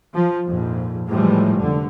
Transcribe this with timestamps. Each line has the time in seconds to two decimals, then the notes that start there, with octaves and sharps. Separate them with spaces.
0.14 F3
0.47 A#1 F2 G#2
1.08 A2 E3 F3 G3 G#3
1.57 F1 D3